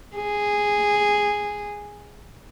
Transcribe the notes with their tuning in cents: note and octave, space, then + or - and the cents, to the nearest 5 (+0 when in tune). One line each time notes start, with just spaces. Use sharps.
G#4 -5